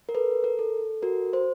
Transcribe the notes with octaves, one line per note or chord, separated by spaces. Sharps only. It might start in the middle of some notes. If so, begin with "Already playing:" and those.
A#4
A4 B4
A#4
A4
F#4 A#4
C5